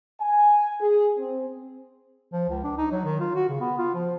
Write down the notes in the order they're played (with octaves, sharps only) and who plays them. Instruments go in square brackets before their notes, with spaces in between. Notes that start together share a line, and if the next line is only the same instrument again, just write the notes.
[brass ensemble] G#5
G#4
C4
[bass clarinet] F3
C#2
D4
D#4
F#3
D#3
F4
F#4
C#3
B3
F4
F3